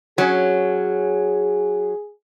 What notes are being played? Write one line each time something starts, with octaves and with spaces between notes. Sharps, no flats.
F#3 C#4 G#4